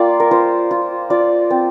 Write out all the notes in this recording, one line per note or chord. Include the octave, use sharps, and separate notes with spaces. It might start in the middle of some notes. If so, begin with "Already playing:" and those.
Already playing: A#3 F4 D5 F5 G5
A#4
F4 C5
F4
F4 D5
C4